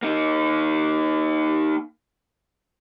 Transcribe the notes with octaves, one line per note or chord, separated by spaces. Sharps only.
A#3 D#4